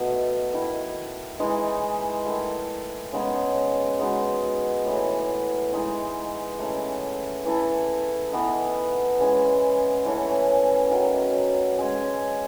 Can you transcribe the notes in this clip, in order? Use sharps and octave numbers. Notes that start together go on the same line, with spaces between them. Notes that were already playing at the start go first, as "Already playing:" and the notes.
Already playing: B2 A3 D#4 F#4
D#3 A3 E4
E3 G#3 D#4
D#3 A3 E4 A4
C#3 G#3 B3 D#4
G#3 B3 D#4 F#4
A2 E3 A3
E3 G#3 D#4
C#3 E3 A3
E3 A3 E4 A4
E3 B3 D#4
C#3 E3 G#3 C#4
E3 A3 C#4
D#3 F#3 C#4
G#3 C#4 G#4